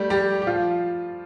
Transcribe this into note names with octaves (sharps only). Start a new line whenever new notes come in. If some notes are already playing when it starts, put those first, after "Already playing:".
Already playing: G3 A3 G4
G3 G4
G4
F3 F4